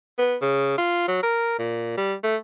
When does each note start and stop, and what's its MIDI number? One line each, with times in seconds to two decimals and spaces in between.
0.18 0.36 59
0.42 0.76 49
0.78 1.04 65
1.08 1.18 54
1.23 1.58 70
1.59 1.94 46
1.97 2.14 55
2.24 2.37 57